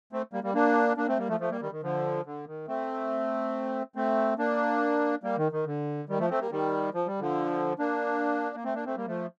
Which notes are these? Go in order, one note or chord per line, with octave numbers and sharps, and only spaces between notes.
A3 C4
G3 A#3
G3 A#3
A#3 D4
A#3 D4
A3 C4
G3 A#3
F3 A3
F3 A3
G3 A#3
D#3 G3
D#3
D3 F3
D3
D#3
A3 C4
A3 C4
A#3 D4
G3 A#3
D#3
D#3
D3
D#3 G3
F3 A3
A3 C4
G3 A#3
D#3 G3
F3
G3
D3 F3
A#3 D4
A#3
A3 C4
A#3 D4
A3 C4
G3 A#3
F3 A3